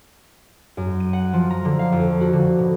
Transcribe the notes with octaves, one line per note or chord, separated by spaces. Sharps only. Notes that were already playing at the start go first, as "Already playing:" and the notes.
F#2
D#7
F#5
F3
A#5
D3
F5
F2
F#4
D3
B2